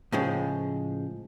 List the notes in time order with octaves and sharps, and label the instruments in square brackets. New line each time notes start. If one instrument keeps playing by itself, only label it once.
[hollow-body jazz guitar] A2 C#3 F3 G#3